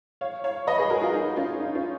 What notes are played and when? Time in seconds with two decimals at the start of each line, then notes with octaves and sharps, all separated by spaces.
0.21 C#5 F5
0.44 C#5 F5
0.67 B4 D#5
0.78 G#4 B4
0.90 F#4 A#4
1.01 F4 G#4
1.14 D#4
1.36 C#4 F4
1.60 D#4
1.75 C#4 F4